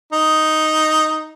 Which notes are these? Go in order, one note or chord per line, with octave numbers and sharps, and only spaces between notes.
D#4